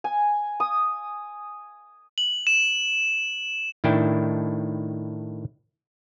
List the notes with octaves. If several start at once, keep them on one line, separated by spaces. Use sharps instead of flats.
G#5
D#6
F#7
E7
A2 D#3 D4 E4 G5 A5